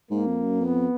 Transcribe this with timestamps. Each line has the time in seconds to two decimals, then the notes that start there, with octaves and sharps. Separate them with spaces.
0.10 G#2 A#3
0.27 F2
0.43 F#2
0.60 F2 B3